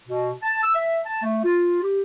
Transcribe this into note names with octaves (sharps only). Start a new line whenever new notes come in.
B2
A5
E6
E5
A5
A3
F4
G4